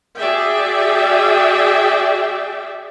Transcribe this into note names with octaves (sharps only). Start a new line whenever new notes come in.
F#4 G#4 D5 E5 G5